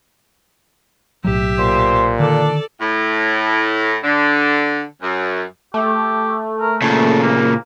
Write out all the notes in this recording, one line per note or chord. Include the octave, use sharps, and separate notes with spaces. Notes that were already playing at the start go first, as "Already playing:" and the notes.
B1 A2 F#3 G4 E5
A#2 C5
D3 D#3 D4 A4 D5
A2
D3
F#2
A3 G4
A#4
A#2 C#3 A4
A#3